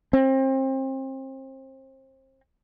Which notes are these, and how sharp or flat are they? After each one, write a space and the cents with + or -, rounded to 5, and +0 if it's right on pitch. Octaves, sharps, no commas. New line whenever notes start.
C4 +30